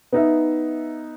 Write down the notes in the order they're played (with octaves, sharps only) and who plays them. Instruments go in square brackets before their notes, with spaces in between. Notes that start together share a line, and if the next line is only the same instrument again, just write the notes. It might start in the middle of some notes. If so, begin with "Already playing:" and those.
[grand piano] B3 D#4 E5